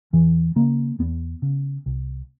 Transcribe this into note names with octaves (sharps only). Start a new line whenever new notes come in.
E2 E3
C#3 A#3
E2 B3
C#3
C2